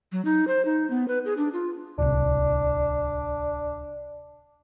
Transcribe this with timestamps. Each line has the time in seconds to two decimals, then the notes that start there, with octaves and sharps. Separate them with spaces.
0.12 F#3
0.25 D#4
0.47 C5
0.65 D#4
0.90 B3
1.08 B4
1.25 G#4
1.37 D4
1.53 F4
1.98 D1 C2 D4